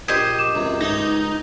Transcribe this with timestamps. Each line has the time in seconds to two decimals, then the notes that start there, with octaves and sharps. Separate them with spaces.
0.08 A#1 G4 C5 D#5 G#6
0.39 D6 E7
0.55 C#2 F#2 C3
0.81 C#2 G#2 D#4 D#6